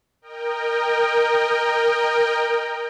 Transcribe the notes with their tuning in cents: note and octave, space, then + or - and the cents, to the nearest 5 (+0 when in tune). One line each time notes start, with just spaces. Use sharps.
A#4 +5 D#5 -15 G5 +15